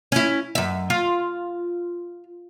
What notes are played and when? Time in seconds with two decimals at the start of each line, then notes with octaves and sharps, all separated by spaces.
0.12 C#4 E4
0.55 F#2 E5
0.90 F4